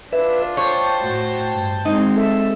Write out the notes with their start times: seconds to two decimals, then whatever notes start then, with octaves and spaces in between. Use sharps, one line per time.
0.13 D4 F4 B4 E5
0.57 C5 C#5 G5 A5
1.00 A2 F#4
1.53 G2
1.85 G#3 C4 D#4
2.16 A4 E5